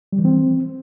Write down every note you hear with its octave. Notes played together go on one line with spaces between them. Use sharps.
G3
E3
C4